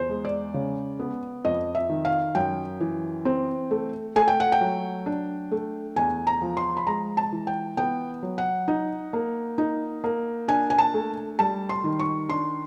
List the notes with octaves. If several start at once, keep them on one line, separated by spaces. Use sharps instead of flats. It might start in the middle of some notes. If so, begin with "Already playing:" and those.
Already playing: E2 C5
G#3
D5
C#3
B3
F2 D#5
E5
D#3
F5
F#2 G5
E3
C4
A3
A3 G#5
G5
F#5
G5
F#3
D4
A3
E2 G#5
A#5
F3
C6
B5
G#3 A#5
A5
E3
G5
B3 G5
F#3
F#5
D#4
A#3
D#4
A#3
D4 G#5
G#5
A5
A3
G3 A5
C6
D#3
C#6
D4 C6